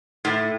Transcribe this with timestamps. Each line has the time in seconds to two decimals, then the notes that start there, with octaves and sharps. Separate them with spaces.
0.25 A2